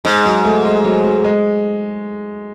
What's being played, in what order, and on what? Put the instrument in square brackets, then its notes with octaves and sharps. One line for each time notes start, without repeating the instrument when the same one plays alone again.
[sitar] G#2 [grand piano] G#3
[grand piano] F#3
A3
G#3
F#3
F#3
G#3